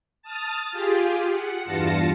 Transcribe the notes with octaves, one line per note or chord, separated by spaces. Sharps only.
A5 D#6 F6 A6
F4 G4 G#4
F#5
E2 G2 F4 A5 A#6 C#7